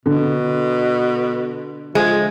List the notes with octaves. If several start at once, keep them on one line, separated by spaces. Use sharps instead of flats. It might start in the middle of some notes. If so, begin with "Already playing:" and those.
B2 D3
F3 G#3